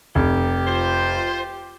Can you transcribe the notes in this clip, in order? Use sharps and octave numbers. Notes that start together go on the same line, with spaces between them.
F1 G4
F4 C5